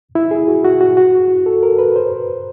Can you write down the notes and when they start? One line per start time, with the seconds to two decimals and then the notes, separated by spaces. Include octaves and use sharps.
0.15 E4
0.31 G#4
0.48 F#4
0.65 F#4
0.81 F#4
0.97 F#4
1.46 A4
1.63 A#4
1.79 B4
1.96 C5